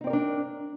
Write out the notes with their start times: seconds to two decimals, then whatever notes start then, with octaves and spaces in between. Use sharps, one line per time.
0.01 D#4
0.04 C4
0.07 D5
0.10 A#4
0.13 D4